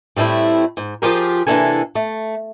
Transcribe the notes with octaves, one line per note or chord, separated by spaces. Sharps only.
A2 G3 A3 C4 E4
G#2
F3 F4 G4 G#4 A#4
C3 E3 A#3 D4 A4 G#5
A3